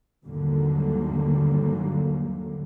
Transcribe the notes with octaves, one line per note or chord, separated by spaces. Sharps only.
D#2 G#2 D3 F#3 G3 A#3